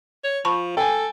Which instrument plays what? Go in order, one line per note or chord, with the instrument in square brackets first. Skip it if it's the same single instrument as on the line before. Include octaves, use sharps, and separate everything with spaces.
[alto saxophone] C#5
[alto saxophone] F3 [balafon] A5 B5 C#6
[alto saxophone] A4 [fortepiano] G5 G#5